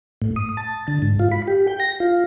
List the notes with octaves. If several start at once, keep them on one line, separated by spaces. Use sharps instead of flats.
A2
D#6
A5
D3
G#2
F4
B5
G4
G5
A#6
F4